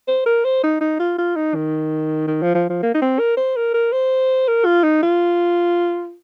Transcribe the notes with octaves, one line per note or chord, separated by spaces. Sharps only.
C5
A#4
C5
D#4
D#4
F4
F4
D#4
D#3
D#3
F3
F3
F3
A#3
D#4
C4
A#4
C5
A#4
A#4
C5
A#4
F4
D#4
F4